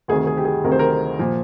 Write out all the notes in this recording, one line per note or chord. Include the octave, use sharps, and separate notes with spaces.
D2 C3 D#3 G#4
G#4
G4
G#4
D2 C3 D#3 A#4
C5
A#4
A#2 F3